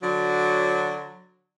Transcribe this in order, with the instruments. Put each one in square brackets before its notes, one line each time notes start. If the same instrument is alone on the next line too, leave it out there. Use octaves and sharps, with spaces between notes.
[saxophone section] D3 F#3